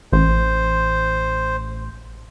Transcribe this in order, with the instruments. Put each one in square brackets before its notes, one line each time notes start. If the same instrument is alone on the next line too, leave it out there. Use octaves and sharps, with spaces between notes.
[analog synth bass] A1 [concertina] C5